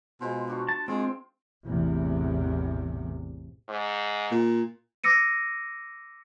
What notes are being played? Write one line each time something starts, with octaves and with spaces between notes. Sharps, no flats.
B2 G#3 F4 C5
D4 F#4 C#6
A5
G#3 C4 F4 C6
A1 E2 C3
G#2
A#2
D6 E6 A#6 C#7 D#7